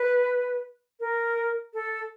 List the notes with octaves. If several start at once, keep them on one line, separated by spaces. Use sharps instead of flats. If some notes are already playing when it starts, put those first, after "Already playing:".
Already playing: B4
A#4
A4